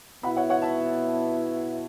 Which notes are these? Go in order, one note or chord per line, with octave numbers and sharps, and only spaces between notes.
B2 B3 E4 F#5 B5
C#5 F#5
C#5 F#5
E5 A5